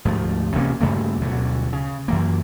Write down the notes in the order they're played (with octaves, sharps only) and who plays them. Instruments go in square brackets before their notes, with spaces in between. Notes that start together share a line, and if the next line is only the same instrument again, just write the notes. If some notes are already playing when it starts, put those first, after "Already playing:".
[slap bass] D2 G#2 F3 A3
E1 C3 A#3 C#4
G2 C#3 A3 A#3
D2 B2 D3 F#3
C#3
F#2 E3 A#3